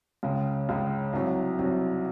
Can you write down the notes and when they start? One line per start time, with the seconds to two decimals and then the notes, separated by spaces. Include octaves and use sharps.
0.23 C#2 C#3 G#3
0.69 C#2 C#3 G#3
1.13 C2 C3 F#3
1.59 C2 C3 F#3